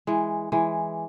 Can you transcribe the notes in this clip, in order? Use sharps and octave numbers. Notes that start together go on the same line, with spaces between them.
E3 G#3
E3 G#3